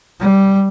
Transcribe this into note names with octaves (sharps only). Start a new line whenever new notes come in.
G3